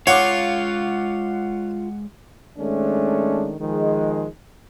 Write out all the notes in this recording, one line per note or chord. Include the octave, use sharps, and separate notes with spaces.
G#3 F4 C#5 F5 F#5 D6
D#3 G#3 A3 C#4 D4
D#3 F3 G#3